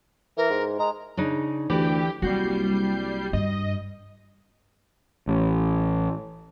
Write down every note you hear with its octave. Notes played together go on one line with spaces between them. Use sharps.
E3 A#4
G#2
G#3 A#5
C#3 D4 D#4
D2 E3 G4 D5
C2 F#3 G3 A#3 F#4 G6 C7
G2 D#5
A1